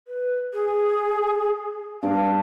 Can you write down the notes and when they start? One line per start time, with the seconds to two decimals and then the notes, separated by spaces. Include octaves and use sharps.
0.07 B4
0.53 G#4
2.03 G2 D4 F5 D6